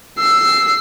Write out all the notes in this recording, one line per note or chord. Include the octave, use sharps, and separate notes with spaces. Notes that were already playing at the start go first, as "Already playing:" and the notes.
E6 C7